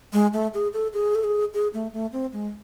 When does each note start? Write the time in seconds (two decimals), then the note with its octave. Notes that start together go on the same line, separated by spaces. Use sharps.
0.13 G#3
0.33 A3
0.54 G#4
0.73 A4
0.93 G#4
1.15 A4
1.24 G#4
1.54 G#4
1.74 A3
1.93 A3
2.12 C4
2.33 G#3